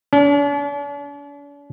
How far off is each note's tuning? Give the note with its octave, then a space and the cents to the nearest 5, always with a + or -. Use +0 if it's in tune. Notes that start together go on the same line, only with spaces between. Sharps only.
D4 -45